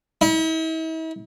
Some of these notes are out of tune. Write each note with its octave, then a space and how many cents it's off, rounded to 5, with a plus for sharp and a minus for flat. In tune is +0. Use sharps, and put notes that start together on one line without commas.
E4 -45